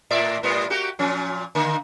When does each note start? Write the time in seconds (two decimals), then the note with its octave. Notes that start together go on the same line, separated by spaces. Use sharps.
0.11 A2 D5 E5
0.43 A2 G3 B3
0.70 A#3 F#4 G4
0.99 A#2 F3 C#4
1.55 D3 A#3